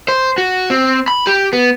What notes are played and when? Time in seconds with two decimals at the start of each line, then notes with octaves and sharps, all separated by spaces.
0.08 C5
0.38 F#4
0.70 C4
1.08 B5
1.27 G4
1.53 B3